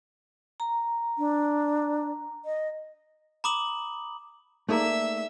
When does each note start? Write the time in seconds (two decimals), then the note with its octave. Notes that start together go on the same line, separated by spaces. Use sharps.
0.60 A#5
1.18 D4
2.45 D#5
3.44 A#5 B5 D6 D#6 F#7
4.69 A3 A#3 D#4 G#4 D5 E5 A#5 E6